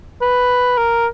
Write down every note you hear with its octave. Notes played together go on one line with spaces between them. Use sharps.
B4
A#4